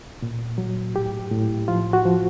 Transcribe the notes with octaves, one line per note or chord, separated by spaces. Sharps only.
A#2
F#3
A2 G4
A2
F3 F4
F#4
F3